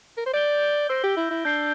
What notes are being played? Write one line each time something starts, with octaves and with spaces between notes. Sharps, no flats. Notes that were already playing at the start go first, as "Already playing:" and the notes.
A#4
C5
D5 G6 D7 G7
C5 E6 A#6 D7
G4
E4
E4
D4 G6 C7 G7